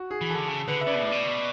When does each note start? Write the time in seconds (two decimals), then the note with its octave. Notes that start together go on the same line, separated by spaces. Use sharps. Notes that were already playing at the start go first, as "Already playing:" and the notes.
Already playing: F#4
0.11 G#4
0.21 E3
0.30 A4
0.35 D3
0.48 C#3 A4
0.68 D3 B4
0.81 E5
0.87 C#3 D5
0.95 B2
1.03 A2 D5
1.12 B2